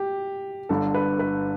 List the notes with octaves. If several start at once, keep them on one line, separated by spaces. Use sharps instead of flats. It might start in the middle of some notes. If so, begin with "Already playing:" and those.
Already playing: G4
G1 G2 D3 A4
B4
B4